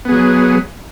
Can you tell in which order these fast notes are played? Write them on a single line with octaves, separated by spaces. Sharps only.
B3 G#4 F#3